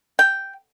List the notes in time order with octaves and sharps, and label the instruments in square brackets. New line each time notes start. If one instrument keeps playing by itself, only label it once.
[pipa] G5